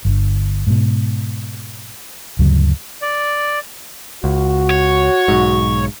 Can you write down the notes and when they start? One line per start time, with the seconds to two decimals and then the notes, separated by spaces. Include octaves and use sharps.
0.05 G1 D3
0.67 G#2 B2
2.39 D2 G2 C#3 F#3
3.02 D5
4.24 C#2 F#4
4.71 C#5
5.28 B1 G#2